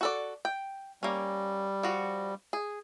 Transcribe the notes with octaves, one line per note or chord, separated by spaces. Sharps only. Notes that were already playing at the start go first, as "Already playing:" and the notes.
F#4 A4 D5
G5
G3 A#3 C#4
F3 F#4
G#4